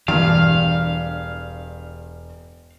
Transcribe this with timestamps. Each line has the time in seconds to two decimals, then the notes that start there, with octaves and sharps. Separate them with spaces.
0.08 E1 G2 E3 F5 F6